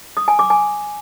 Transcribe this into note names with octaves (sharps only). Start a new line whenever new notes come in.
D#6
G#5
D6
G#5